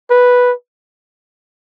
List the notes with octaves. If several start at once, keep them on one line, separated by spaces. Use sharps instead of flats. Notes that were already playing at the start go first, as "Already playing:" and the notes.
B4